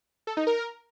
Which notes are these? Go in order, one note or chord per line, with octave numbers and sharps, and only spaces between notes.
A4
D#4
A#4